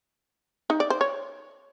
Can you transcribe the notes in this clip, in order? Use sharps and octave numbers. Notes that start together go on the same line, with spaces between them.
D#4
D5
C5
C#5